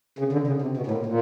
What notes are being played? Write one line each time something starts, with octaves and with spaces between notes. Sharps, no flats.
C#3
D3
C#3
C3
B2
A2
A#2
A#2